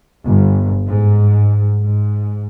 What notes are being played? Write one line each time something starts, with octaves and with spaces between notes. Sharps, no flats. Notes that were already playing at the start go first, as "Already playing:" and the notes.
G1
G#2
G#2